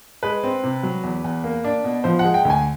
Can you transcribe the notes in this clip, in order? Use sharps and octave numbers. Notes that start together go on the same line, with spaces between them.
G#3 B4
C4
C3
F#3
E2
E2
A#3
D4
B2
F3 C5
F#5
G#3
G5
D2
G#5